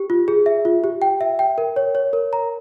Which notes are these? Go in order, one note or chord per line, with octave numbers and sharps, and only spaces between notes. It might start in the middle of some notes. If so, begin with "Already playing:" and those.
Already playing: G4
F4
G#4
E5
F4
G4
G5
E5
G5
A#4
C#5
C#5
A#4
A#5